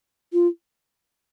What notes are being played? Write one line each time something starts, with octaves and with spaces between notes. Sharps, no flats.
F4